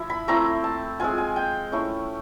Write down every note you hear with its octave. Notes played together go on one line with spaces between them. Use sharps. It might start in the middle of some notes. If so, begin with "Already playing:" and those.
Already playing: F3 E4 E5
B5
A3 C4 E4 A#5
A5
G#3 C4 F4 G#5
G#5
G5
A3 C#4 E4